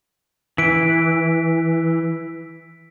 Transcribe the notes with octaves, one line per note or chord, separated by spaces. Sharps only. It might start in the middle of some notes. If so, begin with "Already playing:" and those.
E3 B6 D7